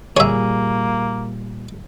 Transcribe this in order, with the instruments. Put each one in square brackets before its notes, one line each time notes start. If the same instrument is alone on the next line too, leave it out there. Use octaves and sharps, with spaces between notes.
[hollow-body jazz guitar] A#2 G3 G#4 [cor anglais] A#3 [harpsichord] C#5 E5